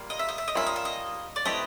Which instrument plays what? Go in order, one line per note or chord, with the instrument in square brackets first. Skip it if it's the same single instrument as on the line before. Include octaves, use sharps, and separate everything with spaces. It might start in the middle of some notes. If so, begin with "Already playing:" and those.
Already playing: [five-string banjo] G3 A#3 F4
[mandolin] D#5
E5
D#5
E5
D#5
[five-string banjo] G3 A#3 C#4 F4 [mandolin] E5
[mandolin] D#5
E5
D#5
D5
[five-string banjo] A3 C4 E4 G4 B4 [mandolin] D#5